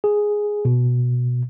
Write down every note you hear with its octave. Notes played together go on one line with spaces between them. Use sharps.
G#4
B2